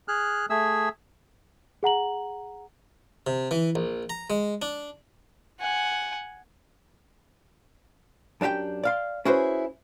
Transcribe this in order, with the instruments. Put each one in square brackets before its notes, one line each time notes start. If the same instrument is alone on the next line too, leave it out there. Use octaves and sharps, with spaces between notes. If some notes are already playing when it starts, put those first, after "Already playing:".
[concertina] G#4 F6 F#6
A3 G#4 E5 E6
[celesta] G#4 F#5 A#5 F#7
[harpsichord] C3
E3
A#1
A#5
G#3
D4
[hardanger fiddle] F#5 G#5
[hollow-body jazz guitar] F#2 D4 F#4 G4 G5
D5 F5 C6
C#4 E4 F#4 G#4 B4 C5